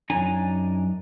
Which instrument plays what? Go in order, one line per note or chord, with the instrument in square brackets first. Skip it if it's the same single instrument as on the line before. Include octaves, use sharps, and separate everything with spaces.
[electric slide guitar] F#2 D4 D#4 G#5 A#5